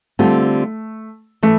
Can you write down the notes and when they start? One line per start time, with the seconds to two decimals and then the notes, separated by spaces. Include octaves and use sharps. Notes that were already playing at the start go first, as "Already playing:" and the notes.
0.19 D3 G3 A3 C4 F4
1.43 E3 A3